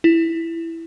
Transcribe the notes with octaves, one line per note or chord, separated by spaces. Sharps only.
E4